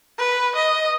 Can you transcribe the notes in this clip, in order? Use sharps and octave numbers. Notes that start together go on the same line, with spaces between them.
B4
D#5